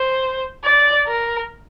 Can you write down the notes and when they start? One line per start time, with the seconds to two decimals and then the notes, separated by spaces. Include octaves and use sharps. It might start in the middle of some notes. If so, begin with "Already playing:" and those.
Already playing: C5
0.64 D5
1.08 A#4